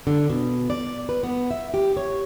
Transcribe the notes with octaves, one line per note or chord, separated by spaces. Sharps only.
D3
B2
D5
B4
B3
E5
G4
C#5